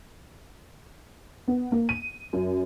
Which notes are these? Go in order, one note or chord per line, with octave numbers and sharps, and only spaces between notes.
B3
A#3
D#7
F#2